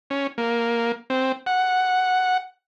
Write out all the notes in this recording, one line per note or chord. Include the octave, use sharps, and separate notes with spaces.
C#4
A#3
C4
F#5